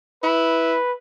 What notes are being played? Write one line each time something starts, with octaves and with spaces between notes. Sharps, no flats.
E4 B4